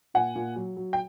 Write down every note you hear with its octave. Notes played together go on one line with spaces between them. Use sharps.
A#2 F#5 G#5
A#2
F#3
F#3
G5